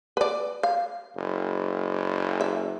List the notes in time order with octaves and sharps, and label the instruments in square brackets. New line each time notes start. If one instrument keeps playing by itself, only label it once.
[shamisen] B4 D5
F5
[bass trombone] F#1
[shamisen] E5